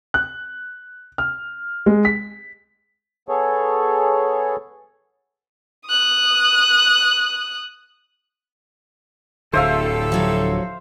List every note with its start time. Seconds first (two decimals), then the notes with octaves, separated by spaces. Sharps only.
0.14 F#6
1.18 F6
1.86 G#3
2.05 B6
3.29 B3 G#4 A4 C#5
5.88 D#6 F#6
9.53 D1 D3 G3 E4 A4 C5 E5 F5
10.12 F3 F#3 C#5